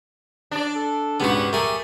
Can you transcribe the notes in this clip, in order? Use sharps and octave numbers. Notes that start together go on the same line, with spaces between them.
D4 D5
A4
G#2 C#3 B3 F#4 G4
A3 G4 G#4 A#4